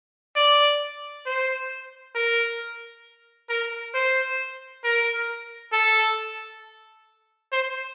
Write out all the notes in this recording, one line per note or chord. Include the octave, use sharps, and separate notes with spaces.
D5
C5
A#4
A#4
C5
A#4
A4
C5